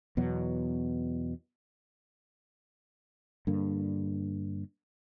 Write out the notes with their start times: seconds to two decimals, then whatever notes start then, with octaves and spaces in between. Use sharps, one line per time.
0.17 E2 B2 F#3
3.47 G2 D3 A#3